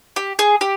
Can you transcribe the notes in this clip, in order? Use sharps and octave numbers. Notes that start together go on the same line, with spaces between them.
G4
G#4
G4